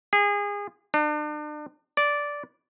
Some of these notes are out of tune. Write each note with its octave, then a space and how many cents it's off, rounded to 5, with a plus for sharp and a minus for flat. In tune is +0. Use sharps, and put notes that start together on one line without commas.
G#4 -30
D4 +40
D5 -10